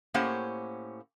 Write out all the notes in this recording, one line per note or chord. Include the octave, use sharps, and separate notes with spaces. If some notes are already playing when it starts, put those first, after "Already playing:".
A2 A#3 C#4 G4 C5 F#5